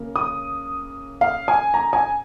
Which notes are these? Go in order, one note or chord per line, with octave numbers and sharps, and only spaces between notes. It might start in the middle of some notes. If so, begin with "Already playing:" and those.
Already playing: C#3 A#3
D#6
F5
G#5
A#5
G#5